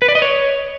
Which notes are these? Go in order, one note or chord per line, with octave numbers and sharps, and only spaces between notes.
B4
D5
D#5
C#5